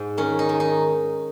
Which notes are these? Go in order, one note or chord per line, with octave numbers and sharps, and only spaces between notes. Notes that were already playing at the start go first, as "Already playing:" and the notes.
Already playing: G#2
D#3 C#4
D#4
D#3
D#4